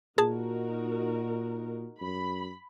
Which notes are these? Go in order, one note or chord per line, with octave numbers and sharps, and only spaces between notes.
A#2 D#4 F#4 G#4 A#4 A5
F#2 B5